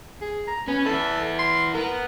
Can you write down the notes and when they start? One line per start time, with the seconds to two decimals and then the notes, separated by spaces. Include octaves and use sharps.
0.22 G#4
0.48 A#5
0.68 B3 C#4
0.86 B3 E4 A4
1.39 C6
1.74 B3 A#4